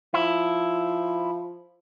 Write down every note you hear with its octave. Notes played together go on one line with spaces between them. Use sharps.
F3 E4